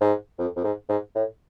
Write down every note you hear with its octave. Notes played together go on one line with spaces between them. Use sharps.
G#2
F2
F2
G#2
G#2
A2